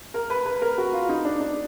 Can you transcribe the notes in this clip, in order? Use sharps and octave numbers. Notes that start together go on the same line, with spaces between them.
A#4
B4
B4
A#4
F#4
F4
D#4
D4
D4